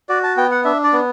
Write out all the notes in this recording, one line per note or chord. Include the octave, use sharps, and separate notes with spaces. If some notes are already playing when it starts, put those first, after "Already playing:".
F#4 D5
A5
B3 G5
F#5
D4 E5
D5
B3